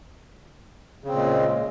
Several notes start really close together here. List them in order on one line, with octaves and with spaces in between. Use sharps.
C#3 C4 A#2 G#3